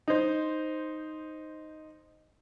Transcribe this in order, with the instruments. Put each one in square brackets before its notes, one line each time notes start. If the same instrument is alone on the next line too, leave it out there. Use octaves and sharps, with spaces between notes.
[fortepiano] D#4 C5